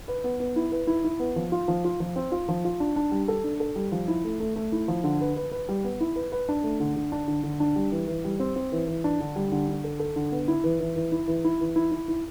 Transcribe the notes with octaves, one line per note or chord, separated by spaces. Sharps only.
B4
B3
B3
E4
B4
E4
E4
B3
F3
F4
F3
F4
F3
C4
F4
F3
F4
D4
D4
G3
A4
D4
A4
G3
F3
E4
A3
A3
A3
E4
F3
D3
B4
B4
B4
G3
B3
E4
B4
B4
D4
A3
D3
D3
D4
D3
D3
D4
G3
E3
E3
G3
C4
C4
E3
E3
D4
D3
G3
D3
D3
A4
A4
D3
B3
E4
E3
E3
E3
E4
E3
E4
E3
E4
E4
E4